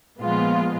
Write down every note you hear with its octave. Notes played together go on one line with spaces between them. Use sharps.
A#2 F3 G#3 B3 F4